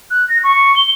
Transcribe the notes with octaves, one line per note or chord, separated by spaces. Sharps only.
F#6
A#6
C#6
G7